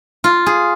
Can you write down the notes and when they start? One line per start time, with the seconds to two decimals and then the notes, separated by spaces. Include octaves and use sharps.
0.24 F4
0.46 G#4